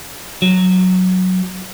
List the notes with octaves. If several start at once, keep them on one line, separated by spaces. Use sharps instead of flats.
F#3